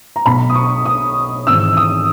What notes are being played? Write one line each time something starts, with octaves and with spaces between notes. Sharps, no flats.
A#5
B1 B2 B5
D#6
C#6
D#6
G#1 G#2 E3 E6
D#6